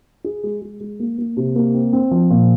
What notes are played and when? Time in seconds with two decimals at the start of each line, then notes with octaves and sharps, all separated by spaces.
0.24 G#4
0.43 G#3
0.62 G#3
0.80 G#3
0.99 A#3
1.18 A#3
1.37 C3
1.56 A#3
1.74 C4
1.93 C4
2.11 F3
2.30 A#2